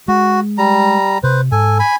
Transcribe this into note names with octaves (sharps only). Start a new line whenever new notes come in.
G#3 F#4
G3 A#5
C3 B4 C5
G#2 A4 G#5
G#5 B5